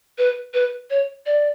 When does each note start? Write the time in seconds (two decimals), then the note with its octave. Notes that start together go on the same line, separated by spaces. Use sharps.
0.18 B4
0.54 B4
0.90 C#5
1.26 D5